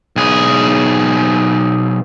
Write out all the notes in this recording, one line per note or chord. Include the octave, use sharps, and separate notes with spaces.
B1 G#4